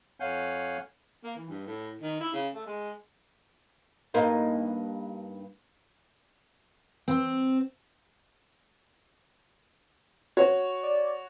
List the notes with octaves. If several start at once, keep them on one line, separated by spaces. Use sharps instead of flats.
F2 C#5 F5 F#5 G#5 G6
A#3
E3
G2
A2
D#3
E4
C#3
A3
G#3
G2 A#3 D#4
C4
F#4 C#5
D5